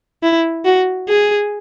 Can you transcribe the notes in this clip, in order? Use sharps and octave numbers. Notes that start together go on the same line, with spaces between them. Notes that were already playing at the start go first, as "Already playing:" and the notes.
E4
F#4
G#4